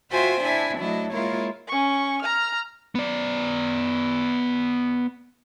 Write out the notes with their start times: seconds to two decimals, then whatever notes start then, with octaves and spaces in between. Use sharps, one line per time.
0.11 F4 F#4 C5 E5 G5 G#5
0.41 D4 E4 E5 G#5
0.78 F#3 A3 D4 E4 D#5
1.11 G#3 A#3 E4 F4 A#4 C#5
1.68 C#4 C#6
2.22 A#5 F6
2.95 B3 D5